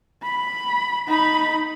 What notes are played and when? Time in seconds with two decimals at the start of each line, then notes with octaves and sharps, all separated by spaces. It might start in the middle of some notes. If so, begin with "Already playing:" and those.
0.23 B5
1.07 D#4 B5